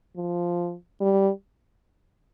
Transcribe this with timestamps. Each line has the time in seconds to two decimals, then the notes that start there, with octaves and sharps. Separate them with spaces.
0.17 F3
1.01 G3